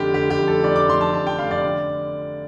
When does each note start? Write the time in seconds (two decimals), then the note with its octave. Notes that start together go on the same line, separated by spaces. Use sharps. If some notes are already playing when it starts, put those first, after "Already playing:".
Already playing: F1 D3 G4
0.14 D3 G4
0.30 G4
0.38 F1
0.48 A4
0.64 F1 D5
0.76 D6
0.89 F1 C6
1.01 A5
1.14 F1 A5
1.27 G5
1.39 F1 F5
1.51 D5
1.64 D3